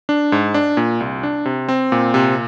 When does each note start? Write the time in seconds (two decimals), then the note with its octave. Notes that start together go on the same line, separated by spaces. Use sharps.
0.09 D4
0.32 G#2
0.54 D4
0.77 A#2
1.00 C2
1.23 D4
1.45 C3
1.69 C4
1.92 A#2
2.14 C3